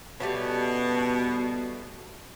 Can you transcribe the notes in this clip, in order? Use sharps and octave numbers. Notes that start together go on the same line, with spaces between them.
B2 G3 A3 C#4